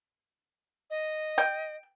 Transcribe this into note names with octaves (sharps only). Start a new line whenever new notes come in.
D#5
G5